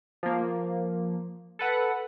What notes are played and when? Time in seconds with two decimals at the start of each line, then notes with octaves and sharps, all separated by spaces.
0.23 F3 A#3
1.59 A4 B4 F#5